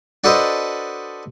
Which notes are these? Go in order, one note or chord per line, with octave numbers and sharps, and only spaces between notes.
D4 F#4 A4 B4 C5 D#5